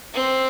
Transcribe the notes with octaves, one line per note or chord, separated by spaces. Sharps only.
C4